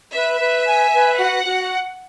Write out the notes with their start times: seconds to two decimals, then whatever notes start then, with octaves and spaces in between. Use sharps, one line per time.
0.14 B4 E5
0.41 B4
0.67 G#5
0.93 B4
1.18 F#4 F#5
1.45 F#4